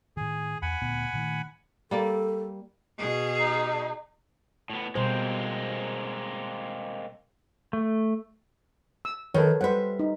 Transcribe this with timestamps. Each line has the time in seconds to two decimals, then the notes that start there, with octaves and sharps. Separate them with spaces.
0.17 A2 D#3 G#4
0.62 E2 F#5 G#5 B5
0.82 D2 A#2 B3
1.13 A#2 D#3 A3
1.91 G3 A#3 A4 D5
2.98 B2 G#4
3.40 D#4
4.70 A2 B3
4.95 B2 G3 G#3 A#3 C4 C5
7.73 A3
9.05 E6
9.34 D#3 A4 B4 C#5
9.61 G3 B4 C5 E5 F#5
9.99 D#4